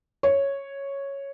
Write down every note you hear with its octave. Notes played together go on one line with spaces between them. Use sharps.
C#5